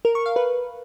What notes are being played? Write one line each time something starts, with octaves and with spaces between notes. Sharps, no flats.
A#4
C#6
F5
B4